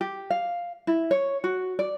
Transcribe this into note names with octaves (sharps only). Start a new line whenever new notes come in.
G4
F5
E4
C#5
F#4
D5